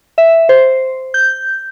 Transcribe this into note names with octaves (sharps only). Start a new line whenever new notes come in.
E5
C5
G6